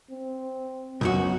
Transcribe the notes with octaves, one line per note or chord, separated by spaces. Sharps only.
C4
B1 F#2 C#4 F#4